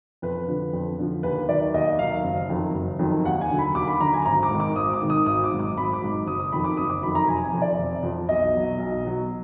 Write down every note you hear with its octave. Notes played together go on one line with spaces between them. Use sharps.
F2 B4
D3 F3
F2
D3 F3
D#2 B4
D#3 F#3 D5
D#2 D#5
D#3 F#3 F5
F#1
F2 D#3 F#3
F#1
F2 D#3 F#3
D#2 F#5
G#5
D3 F#3
B5
D#2 D6
B5
D3 F#3 A#5
G#5
G#1 A#5
D6
G#2 D#3
D6
G#1 D#6
D6
G#2 D#3
D#6
G#1 D#6
D6
G#2 F#3
D6
G#1 B5
D6
G#2 F#3
F#1 D#6
D#6
F2 D#3 F#3 B5
D6
F#1 D#6
D6
F2 D#3 F#3 B5
A#5
F1 G#5
G#5
F2 F3
D5
F1
F2 F3
B1 D#5
B2 F#3
B1
B2 F#3